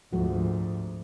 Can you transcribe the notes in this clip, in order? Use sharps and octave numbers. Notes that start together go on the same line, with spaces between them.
D2 G#2 F3 G#3 F#4